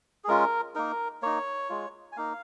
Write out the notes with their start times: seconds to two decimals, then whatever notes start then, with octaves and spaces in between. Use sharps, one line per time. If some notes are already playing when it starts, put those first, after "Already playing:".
0.24 G#4
0.28 G#3 C#4 F4 A#4
0.75 A#3 D#4 A#4
1.22 A#3 D#4 C#5
1.69 G#3 F4
2.12 G#5
2.17 A#3 D#4 F5